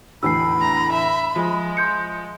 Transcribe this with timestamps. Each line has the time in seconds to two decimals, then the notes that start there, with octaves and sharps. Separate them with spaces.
0.23 E2 A2 D3 B5 E6 C7
0.61 A#5
0.93 E5
1.36 F3 G#3
1.77 C6 G6 C#7